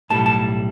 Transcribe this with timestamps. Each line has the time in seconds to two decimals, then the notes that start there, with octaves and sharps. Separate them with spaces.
0.10 B1 A2 G3 A5
0.26 A5